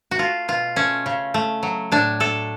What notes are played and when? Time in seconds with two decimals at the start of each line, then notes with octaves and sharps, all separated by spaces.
0.11 F#4
0.19 A3 F4
0.48 B2 F4
0.76 A3 C#4
1.06 C#3
1.34 A3
1.63 F#3
1.92 A2 D4
2.20 A3 A4